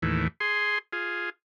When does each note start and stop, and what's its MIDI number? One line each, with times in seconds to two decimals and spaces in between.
0.02 0.28 39
0.02 0.28 45
0.02 0.28 52
0.40 0.78 68
0.40 0.78 84
0.93 1.30 65
0.93 1.30 68